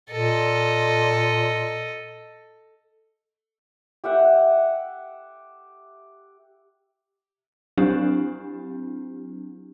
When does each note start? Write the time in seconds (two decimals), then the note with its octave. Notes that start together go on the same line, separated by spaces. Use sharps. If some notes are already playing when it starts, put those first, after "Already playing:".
0.10 A#2 A4 D#5
4.04 G4 E5 F#5
7.77 F#3 C4 D4 E4 G4